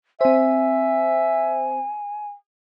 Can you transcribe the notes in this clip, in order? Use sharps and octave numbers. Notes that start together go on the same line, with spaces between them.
C4 C5 E5 G#5